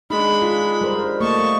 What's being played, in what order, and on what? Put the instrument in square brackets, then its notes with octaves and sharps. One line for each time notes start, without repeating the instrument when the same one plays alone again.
[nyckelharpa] G#3 D4 [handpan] D#4 [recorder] B5
[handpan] F4
G3 A#4 C5
[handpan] A3 A#3 [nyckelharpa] D#5 A5 [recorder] C#6